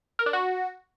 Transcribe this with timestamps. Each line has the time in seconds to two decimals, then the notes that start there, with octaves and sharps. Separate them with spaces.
0.19 A#4
0.26 D4
0.33 F#4